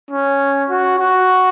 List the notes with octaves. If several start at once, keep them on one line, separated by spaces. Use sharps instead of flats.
C#4
F#4
F#4